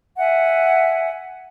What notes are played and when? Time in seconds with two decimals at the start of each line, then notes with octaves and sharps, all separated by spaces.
0.18 E5 F#5 G#5